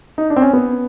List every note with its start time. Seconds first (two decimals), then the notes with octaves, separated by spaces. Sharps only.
0.18 D#4
0.30 D4
0.36 C4
0.42 C#4
0.53 B3